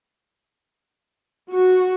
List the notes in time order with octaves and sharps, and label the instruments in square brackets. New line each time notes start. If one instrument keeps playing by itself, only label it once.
[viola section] F#4